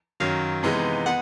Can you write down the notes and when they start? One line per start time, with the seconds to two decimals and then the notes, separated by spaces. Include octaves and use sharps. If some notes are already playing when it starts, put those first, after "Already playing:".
0.20 F#2 D#3 F#3 F5
0.63 C3 E3 G#3 B3 D#4
1.06 B3 F#5